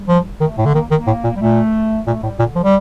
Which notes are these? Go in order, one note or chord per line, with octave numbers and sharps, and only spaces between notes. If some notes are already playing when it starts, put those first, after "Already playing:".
Already playing: G3
F3
D#3 A3
A2 A3
D3
D#3 A#3
D#3
A#3
A2
A#2
G3
A#2 A3
A#2 A3
A2 G3
A#2 D3
F3
G3